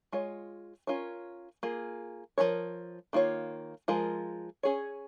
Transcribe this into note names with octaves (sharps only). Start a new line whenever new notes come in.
G#3 F4 C#5
C#4 F4 A#4 C#5
A#3 F4 G#4
F3 C#4 A#4 C#5
D#3 A#3 F4 C#5
F3 G#3 F4 A#4
C#4 G#4 C#5